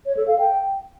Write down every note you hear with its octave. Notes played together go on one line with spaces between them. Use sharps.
C#5
A4
F5
G5